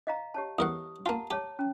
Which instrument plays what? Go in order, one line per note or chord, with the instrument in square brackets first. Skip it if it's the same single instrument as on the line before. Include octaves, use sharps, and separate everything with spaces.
[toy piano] D#5 F5 A#5
G4 C#5 A5
[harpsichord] E2 A#4 F#5 [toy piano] G4 D#6
[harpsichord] A#3 F4 [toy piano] F#5 A5 A#5
[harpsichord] G4 [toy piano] C#5 A5
[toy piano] C#4